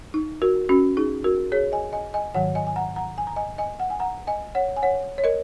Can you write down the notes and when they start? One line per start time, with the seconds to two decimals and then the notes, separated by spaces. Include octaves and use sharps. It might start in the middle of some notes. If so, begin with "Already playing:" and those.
0.14 D#4
0.42 F#4 A#4
0.69 C#4 F#4
0.97 D#4 G#4
1.24 F#4 A#4
1.52 G#4 C#5
1.72 D#5 G#5
1.93 D#5 G#5
2.14 D#5 G#5
2.35 G#2 D#3 F#3 C#5 F#5
2.55 D#5 G#5
2.67 G#5
2.76 F#5 A#5
2.96 F#5 A#5
3.18 G#5
3.27 A#5
3.36 D#5 G#5
3.58 D#5 G#5
3.80 F#5
3.90 G#5
4.00 F#5 A#5
4.27 D#5 G#5
4.55 C#5 F#5
4.76 G#5
4.82 C#5 F#5
5.18 C#5
5.24 A#4 D#5